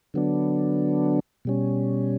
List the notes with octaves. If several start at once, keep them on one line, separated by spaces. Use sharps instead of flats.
D3 F#3 B3 D4
B2 G3 C#4